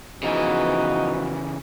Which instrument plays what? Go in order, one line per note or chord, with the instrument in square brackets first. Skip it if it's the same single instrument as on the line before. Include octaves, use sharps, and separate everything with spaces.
[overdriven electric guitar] C#3 E3 [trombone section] F3 B3 F#4 [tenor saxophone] D#4